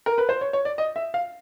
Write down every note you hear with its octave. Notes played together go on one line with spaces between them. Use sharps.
A#4
B4
C5
C#5
C#5
D5
D#5
E5
F5